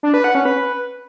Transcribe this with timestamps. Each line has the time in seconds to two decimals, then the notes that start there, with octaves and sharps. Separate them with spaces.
0.03 D4
0.14 B4
0.24 F#5
0.35 C#4
0.45 B4